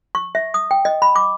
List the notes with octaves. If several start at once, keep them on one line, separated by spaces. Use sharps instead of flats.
C#6
E5
D#6
G5
D#5
B5
D6